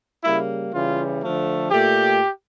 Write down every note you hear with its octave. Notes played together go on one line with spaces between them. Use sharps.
C#3 G3 A#3 E4
C#3 E3 G3 F4
D3 F3 A3
A#2 A3 G4